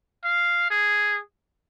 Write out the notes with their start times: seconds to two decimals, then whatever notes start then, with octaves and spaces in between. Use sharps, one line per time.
0.24 F5
0.70 G#4